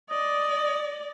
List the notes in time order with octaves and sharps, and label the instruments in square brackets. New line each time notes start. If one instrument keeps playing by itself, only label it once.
[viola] D5 [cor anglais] D#5